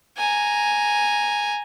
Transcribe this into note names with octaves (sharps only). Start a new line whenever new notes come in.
G#5 A#5